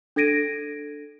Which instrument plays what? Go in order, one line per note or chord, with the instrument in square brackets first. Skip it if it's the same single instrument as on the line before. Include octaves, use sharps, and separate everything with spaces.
[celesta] D4 A4 G#6 A#6 D7 D#7